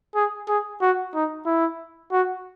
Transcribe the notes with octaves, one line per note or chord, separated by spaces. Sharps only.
G#4
G#4
F#4
D#4
E4
F#4